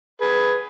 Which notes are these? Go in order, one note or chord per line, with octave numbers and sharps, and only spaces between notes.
G#4 B4